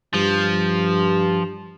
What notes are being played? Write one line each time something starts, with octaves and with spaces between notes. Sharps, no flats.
G2 F3